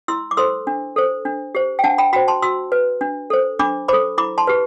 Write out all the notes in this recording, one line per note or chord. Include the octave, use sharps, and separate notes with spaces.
E4 C6 E6
D6
A4 C5 C6 E6
D4
A4 C5
D4
G4 C5
G5
D4 F#5 A5
G5 B5
F#4 C5 G5 B5
A5 C6
F#4 C6 E6
B4
D4
A4 C5
D4 B5 D6
A4 C5 B5 D6
E4 B5 D6
A5 C6
G4 B4